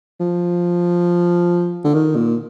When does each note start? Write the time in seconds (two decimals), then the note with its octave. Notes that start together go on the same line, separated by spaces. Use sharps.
0.20 F3
1.84 D3
1.94 D#3
2.16 A#2